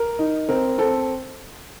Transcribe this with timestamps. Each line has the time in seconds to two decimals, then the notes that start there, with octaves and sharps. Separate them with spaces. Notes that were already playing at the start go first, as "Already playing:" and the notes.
Already playing: A#4
0.19 D#4
0.49 C4 A#4
0.78 C4 A4